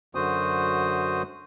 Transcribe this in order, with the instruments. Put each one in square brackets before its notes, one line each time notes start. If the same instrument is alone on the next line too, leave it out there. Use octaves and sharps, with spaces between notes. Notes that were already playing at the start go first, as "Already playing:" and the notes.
[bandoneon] F#2 D3 F#4 C5 D#6